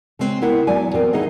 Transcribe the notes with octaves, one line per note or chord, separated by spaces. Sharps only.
C#3 G#3 C4 B4
B3 E4 A#4 F#5 G5
E2 F#3 D5 G#5
B3 C4 A#4
E3 D#4 G#4 D#5 F#5